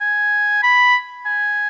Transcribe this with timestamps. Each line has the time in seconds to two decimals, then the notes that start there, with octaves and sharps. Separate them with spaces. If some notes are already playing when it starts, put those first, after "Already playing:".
0.01 G#5
0.63 B5
1.26 G#5